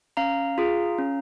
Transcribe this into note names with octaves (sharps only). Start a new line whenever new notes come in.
C#4 F5 A#5
F4 G#4
C#4